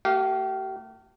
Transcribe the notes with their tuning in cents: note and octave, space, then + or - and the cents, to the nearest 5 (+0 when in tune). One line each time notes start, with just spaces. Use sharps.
A3 +35 G4 -35 F5 +0